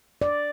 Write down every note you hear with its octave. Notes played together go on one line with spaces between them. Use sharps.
D5